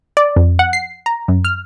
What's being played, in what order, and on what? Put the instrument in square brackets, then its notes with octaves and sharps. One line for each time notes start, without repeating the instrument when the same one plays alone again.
[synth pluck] D5
F2
F#5
C7
A#5
F#2
F6